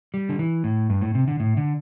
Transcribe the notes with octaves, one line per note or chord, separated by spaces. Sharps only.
G3
D3
E3
A2
G2
A2
C3
D3
A2
D3